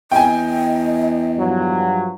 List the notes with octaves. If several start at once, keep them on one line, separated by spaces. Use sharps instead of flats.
E2 D#5 G5 G#5
G2 F3 F#3